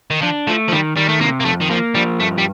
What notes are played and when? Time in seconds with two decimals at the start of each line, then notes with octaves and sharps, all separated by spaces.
0.11 D#3
0.22 F3 D4
0.47 F3 A3
0.68 F3
0.72 D#3 G3
0.97 D#3 G3
1.09 A3
1.21 C3 A#3
1.40 A#3
1.45 F2 A3
1.61 D#3
1.70 F3 A#3
1.95 F3 G3
2.20 G2 A3
2.38 G3